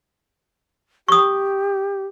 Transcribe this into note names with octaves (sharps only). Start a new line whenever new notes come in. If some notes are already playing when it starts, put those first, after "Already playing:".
G4 C#6 D#6